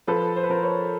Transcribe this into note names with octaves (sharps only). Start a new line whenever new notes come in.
F3 A4 B4
C5
B4
F3 A#4 C5
B4 C#5